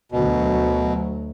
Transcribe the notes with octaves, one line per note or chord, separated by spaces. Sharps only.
D2 B2 F#3